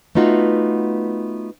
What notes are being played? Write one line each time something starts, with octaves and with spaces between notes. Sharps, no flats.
A3 B3 D#4 F4 F#4